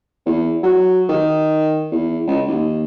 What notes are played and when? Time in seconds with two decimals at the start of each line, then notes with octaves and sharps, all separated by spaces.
0.26 E2
0.63 F#3
1.09 D#3
1.92 E2
2.27 C#2
2.47 D#2